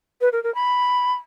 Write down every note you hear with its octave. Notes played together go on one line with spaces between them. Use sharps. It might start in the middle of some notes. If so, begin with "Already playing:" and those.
B4
A#4
A#4
B5